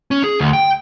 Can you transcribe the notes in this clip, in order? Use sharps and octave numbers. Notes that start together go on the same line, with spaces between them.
C#4
G#4
D2
G5